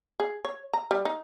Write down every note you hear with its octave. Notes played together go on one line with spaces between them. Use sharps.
G#4
C#5
A#5
G3
D#4